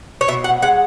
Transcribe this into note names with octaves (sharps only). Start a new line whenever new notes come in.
C#5
B2 E5
F#5
G#3 F#5